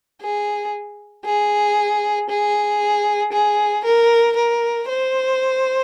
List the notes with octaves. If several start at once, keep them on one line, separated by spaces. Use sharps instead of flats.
G#4
G#4
G#4
G#4
A#4
A#4
C5